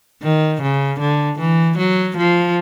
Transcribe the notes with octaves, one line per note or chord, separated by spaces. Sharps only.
D#3
C#3
D3
E3
F#3
F3